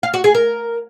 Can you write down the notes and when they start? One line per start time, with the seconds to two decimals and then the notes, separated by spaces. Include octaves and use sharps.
0.03 F5
0.14 F#4
0.24 G#4
0.34 A#4